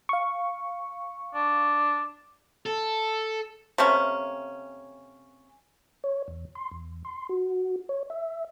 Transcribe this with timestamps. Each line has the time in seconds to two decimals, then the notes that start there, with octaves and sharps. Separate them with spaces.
0.09 F5 C#6
1.35 D4
2.66 A4
3.78 C3 A3 A#3 C#4
6.04 C#5
6.28 E2
6.55 C6
6.71 E2
7.05 C6
7.29 F#4
7.89 C#5
8.10 E5